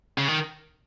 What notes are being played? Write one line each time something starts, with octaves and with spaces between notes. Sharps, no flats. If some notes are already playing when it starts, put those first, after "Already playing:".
C#3
D#3